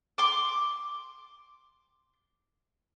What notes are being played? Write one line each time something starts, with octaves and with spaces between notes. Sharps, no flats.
C6 D6